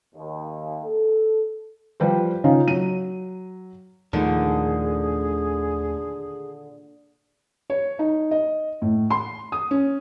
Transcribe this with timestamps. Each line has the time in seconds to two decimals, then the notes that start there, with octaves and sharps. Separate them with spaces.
0.15 D#2
0.85 A4
2.00 F3 G3 B4 C5
2.44 C#3 C#4 D#4 F4
2.68 F#3 D#7
4.13 D#2 A#2 D3 D#3 F3 A3 G#4
7.70 C#5
7.99 D#4
8.31 D#5
8.82 A2
9.10 C6
9.52 D#6
9.71 C#4